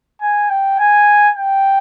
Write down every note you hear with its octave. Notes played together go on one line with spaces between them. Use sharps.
G#5
G5
G#5
G5